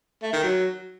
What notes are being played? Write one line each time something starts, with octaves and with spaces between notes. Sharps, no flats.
A3
D#3
F#3